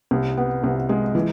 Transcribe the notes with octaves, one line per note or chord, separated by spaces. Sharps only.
C2
B3
C2
G#3
E3